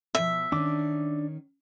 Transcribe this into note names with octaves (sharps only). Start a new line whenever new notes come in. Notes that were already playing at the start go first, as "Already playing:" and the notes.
B2 F3 E5
D#3 C#4 D4 D6